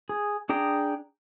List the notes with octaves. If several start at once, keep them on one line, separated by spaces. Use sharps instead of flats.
G#4
D4 G#4 G5 A#5